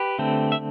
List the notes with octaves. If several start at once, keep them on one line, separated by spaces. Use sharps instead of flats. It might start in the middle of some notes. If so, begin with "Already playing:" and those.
Already playing: G4 B4
D3 A3 C4
E5